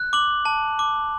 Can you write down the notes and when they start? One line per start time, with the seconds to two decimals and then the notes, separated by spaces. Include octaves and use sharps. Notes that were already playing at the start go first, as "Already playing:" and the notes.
Already playing: F#6
0.13 D6 F#7
0.45 A5
0.79 D6